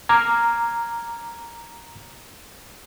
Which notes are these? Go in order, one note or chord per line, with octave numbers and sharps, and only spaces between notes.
A#5 D6 F6 G#6